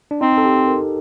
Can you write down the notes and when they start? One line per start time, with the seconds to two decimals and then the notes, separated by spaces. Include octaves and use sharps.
0.11 D4
0.21 C4 D#4
0.37 A4
0.45 G4
0.68 A#4